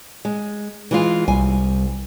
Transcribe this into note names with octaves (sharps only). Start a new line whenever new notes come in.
G#3
E3 G#3 F4
C2 G#5